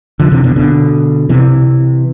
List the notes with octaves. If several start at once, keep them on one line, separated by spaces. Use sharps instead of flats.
D3 F3
C3 E3
B2 D3
B2 D3
C3 E3